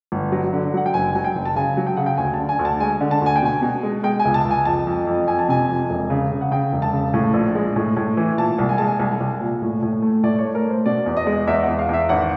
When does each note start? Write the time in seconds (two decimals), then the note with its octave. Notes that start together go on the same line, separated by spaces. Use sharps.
0.12 G1
0.32 F#3
0.53 D3
0.74 F#3 F#5
0.86 G5
0.94 F#1 G#5
1.15 F#3 G#5
1.24 G5
1.35 F#1
1.45 A5
1.56 C#3 G#5
1.77 F#3
1.87 G5
1.97 C#3 F#5
2.06 G5
2.17 D2 G#5
2.34 A5
2.39 D3
2.49 G#5
2.59 D2
2.65 A5
2.80 G#3 G#5
3.01 D3
3.11 A5
3.21 D2 G#5
3.36 G5
3.42 B2 G#5
3.62 B2
3.83 G#3
4.03 G#3 G5
4.19 G#5
4.25 C#2
4.34 A5
4.45 C#2
4.51 G#5
4.65 F2 A5
4.87 F2
5.07 F2
5.27 F2 G#5
5.39 A5
5.49 C3 G#5
5.69 F2
5.90 E1
6.10 C#3
6.31 C#3
6.41 F#5
6.51 C#3 G5
6.72 E1
6.82 A5
6.93 C#3
7.14 A2
7.34 A#1
7.55 G#3
7.76 A2
7.97 A2
8.17 E3
8.38 A#2 A5
8.58 C2
8.69 G#5
8.78 G#3 A5
8.88 G#5
8.99 C2
9.20 C2
9.40 A#2
9.62 A2
9.82 A2
10.02 A3
10.23 A2 D5
10.38 C#5
10.45 A3
10.55 A#4
10.65 A3 C5
10.86 B2 D5
11.06 E2
11.17 D#5
11.27 G#3
11.47 E2 E5
11.63 F#5
11.68 E2
11.79 F5
11.89 E2 E5
12.09 G#1 F#5